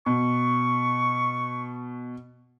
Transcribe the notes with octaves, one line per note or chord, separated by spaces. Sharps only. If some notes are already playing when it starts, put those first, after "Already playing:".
B2 C#6